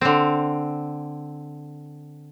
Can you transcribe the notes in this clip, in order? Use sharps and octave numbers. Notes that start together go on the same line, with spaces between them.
D3 C4